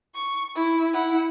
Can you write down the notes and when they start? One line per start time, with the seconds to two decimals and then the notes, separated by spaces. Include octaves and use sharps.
0.15 C#6
0.55 E4
0.93 E4 F#5